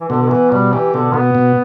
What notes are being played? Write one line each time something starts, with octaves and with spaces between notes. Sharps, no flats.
E3
B2 D3
D3
E3 B3
B2 G3
E3 G4
B2 D3
B2 B3
B2